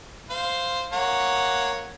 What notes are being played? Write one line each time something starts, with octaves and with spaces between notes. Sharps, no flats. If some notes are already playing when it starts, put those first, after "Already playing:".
C5 F5
A#3 C#5 F#5